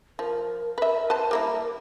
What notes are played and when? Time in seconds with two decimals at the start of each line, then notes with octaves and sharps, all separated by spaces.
0.19 F3 A#4
0.78 B4 E5
1.10 B4 C5 A5
1.31 G3 A#3 E4